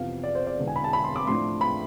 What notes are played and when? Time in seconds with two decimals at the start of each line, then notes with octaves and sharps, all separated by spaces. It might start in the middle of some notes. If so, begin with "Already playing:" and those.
Already playing: F2 C3 E3 B3 F5
0.24 D5
0.35 C5
0.47 D5
0.58 E1 E2 D3
0.68 G#5
0.76 B5
0.84 A5
0.93 B5
1.04 C6
1.16 D6
1.27 A2 F3 A3 D4 C6
1.61 B5